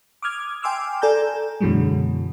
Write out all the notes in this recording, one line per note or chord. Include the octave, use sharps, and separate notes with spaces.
D6 D#6 F6 G#6
G5 G#5 C6 D6 E6 F6
A4 D5 G#5 A#5 G6
F#2 B2 D3 E3 F#3 G#3